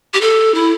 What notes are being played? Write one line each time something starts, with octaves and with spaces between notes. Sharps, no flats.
G4
A4
E4